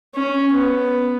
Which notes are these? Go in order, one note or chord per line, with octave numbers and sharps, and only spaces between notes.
C#4
B3